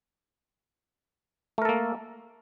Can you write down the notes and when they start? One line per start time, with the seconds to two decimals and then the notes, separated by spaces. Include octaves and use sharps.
1.58 A3
1.62 A#4
1.65 A4
1.69 A#3